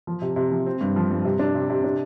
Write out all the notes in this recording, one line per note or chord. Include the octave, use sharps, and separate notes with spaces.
F3
C3
C3
F3
C4
G2
F3
G2
C3
D4
C3
C3
D4